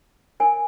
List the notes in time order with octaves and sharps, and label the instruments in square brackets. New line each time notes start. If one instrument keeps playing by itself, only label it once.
[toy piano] D#4 A#4 C#5 G#5